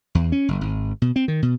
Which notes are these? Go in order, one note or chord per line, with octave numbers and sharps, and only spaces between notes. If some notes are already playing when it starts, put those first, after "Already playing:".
E2
C#4
F#1
G#1
B2
C4
D#3
B2